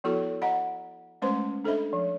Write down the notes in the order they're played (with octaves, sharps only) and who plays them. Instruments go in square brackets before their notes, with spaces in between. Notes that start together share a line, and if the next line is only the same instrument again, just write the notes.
[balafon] F3 B3 E4 F#4 A4 C#6
D#5 F#5 A#5 B5
G#3 A3 C#4 B4 C5 C6
D4 A4 C5 D#5 E5 B5
F3